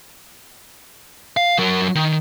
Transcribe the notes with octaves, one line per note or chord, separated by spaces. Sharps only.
F5
F#3 A#4
D#3